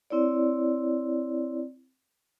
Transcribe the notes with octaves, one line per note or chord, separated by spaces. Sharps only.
C4 E4 C#5 D5